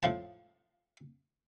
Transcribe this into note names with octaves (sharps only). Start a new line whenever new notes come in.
A2 F3 A5